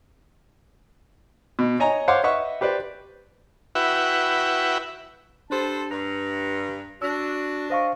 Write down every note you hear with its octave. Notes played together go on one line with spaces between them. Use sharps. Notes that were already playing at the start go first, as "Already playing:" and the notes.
B2
C#5 D#5 G#5 A#5
C5 C#5 F5 F#5 C6 D6
B4 D#5 E5 F#5 C#6
G4 B4 C5 D5
E4 F#4 B4 E5 F#5 G5
D4 G4 A4 B4 C5 A5
G2 A#5
D4 F#4 E6
C5 D#5 F5 C#6